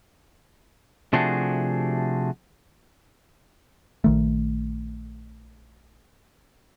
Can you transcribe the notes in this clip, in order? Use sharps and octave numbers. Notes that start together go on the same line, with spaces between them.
C3 F3 A3 D4 F#4 G#4
A#1 D#3 A3